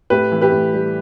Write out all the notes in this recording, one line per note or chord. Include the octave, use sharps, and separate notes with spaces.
A2 G4 B4
E3
G4 B4
A2
G3